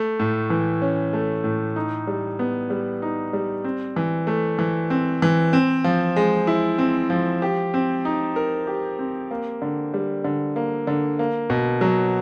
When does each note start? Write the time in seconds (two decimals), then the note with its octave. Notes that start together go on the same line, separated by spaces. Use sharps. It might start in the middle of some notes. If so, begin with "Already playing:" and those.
Already playing: A3
0.19 A2
0.50 E3
0.82 C#4
1.13 A3
1.44 A2
1.76 D#4
2.07 G3
2.39 B3
2.70 G3
3.02 D#4
3.33 G3
3.64 C4
3.96 E3
4.27 A3
4.59 E3
4.90 C4
5.22 E3
5.53 C4
5.84 F3
6.16 G#3
6.47 E4
6.78 C4
7.10 F3
7.42 G4
7.74 C4
8.05 D#4
8.36 A#4
8.67 G4
8.99 C4
9.31 A#3
9.62 D3
9.94 G3
10.24 D3
10.56 A#3
10.87 D3
11.19 A#3
11.50 B2
11.81 F#3